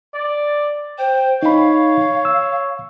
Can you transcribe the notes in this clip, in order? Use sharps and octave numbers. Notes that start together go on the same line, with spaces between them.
D5
C5 G5
D#4 C#5 F5 B5
E6